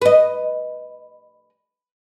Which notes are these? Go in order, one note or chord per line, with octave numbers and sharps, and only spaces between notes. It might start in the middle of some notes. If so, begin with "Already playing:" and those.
B4 D#5